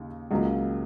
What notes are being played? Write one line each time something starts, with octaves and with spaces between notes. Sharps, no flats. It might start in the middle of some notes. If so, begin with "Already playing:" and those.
Already playing: D#2 C#3
C#2 C#3 F#3 A#3